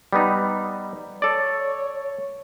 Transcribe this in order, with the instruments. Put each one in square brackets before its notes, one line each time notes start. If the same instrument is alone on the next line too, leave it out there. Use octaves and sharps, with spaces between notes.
[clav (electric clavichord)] G3 B3 D#4
[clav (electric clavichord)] A4 D5 [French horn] C#5